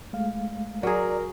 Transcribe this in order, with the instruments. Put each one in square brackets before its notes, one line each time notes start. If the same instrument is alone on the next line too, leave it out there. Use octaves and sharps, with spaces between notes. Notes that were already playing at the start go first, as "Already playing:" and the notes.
[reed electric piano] G#3 A3 F5
[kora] F#3 G#4 [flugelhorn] A#4 [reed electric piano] D5